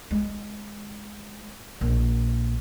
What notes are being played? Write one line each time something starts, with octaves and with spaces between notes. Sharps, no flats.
G#3
A#1